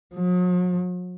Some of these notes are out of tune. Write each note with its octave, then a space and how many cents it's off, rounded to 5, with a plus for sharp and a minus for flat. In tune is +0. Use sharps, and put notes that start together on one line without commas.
F#3 -45